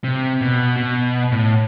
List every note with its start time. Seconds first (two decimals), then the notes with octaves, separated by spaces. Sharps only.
0.04 C3
0.41 B2
0.77 B2
1.32 A2